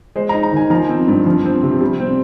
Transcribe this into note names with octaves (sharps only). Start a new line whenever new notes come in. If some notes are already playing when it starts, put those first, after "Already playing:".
G#3 C5
A#5
D#4
A#5
D#3 G#5
F3 A#5
C4
G2
F3
C4
C3
G3
C4